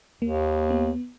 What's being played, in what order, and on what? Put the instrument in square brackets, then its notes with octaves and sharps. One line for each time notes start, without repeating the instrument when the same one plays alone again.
[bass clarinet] D#2 [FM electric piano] A#3
[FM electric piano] B3